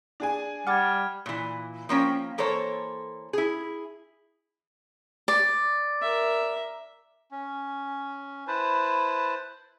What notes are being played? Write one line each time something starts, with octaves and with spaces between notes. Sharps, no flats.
D4 G#4 G#5
G3 F#5 D6 F6 G#6 A6
A#2 E3
F3 A#3 C#4 G5
E3 A#3 A4 C5 C#5
E4 G#4
D5
A#4 E5
C#4
E4 B4 C5 A5